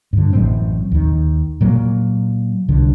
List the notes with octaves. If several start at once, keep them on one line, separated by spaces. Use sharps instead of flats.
G2 D3
A1 F#2 A2 C4
D#2 D#3
A#2 F#3 A#3
C2 D3